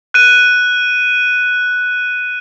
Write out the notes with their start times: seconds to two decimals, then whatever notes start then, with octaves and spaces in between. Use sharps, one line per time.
0.14 F#6 D#7